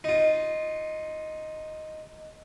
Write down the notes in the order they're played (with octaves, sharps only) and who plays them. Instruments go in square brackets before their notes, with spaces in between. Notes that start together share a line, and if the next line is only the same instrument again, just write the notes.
[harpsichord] D#4 F4